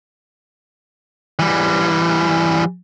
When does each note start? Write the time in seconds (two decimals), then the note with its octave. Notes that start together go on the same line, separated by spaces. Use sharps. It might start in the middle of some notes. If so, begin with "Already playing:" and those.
1.39 E3 G3